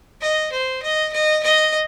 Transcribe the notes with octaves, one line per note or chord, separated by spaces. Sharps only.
D#5
C5
D#5
D#5
D#5